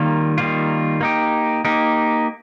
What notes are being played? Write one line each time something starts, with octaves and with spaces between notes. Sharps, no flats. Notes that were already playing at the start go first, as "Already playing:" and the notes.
Already playing: D#3 G3 A#3 F4
D#3 G3 A#3 F4
A#3 D#4 G4
A#3 D#4 G4